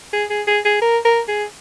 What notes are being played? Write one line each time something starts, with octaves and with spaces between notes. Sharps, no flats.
G#4
G#4
G#4
G#4
A#4
A#4
G#4